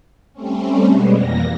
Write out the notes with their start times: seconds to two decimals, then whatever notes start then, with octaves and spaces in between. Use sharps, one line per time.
0.33 G3 A3 C4 C#4
0.87 B2 G3 G#3 B3
1.16 F2 E3 A#3 A#6